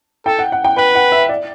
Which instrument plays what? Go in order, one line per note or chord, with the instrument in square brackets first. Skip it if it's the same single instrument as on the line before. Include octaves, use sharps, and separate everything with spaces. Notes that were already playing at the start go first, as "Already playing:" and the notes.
[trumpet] A4 [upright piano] G5
[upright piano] F#5
F#5
G5
[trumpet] B4 [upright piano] G5
[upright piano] F#5
E5
D5